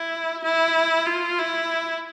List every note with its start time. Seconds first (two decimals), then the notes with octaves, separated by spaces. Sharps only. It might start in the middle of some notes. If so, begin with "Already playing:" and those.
Already playing: E4
0.44 E4
1.06 F4
1.39 E4